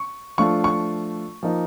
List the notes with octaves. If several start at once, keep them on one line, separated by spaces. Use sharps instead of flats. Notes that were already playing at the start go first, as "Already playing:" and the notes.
Already playing: C#6
F3 A3 D4 F4 C#6
C#6
F3 A#3 D#4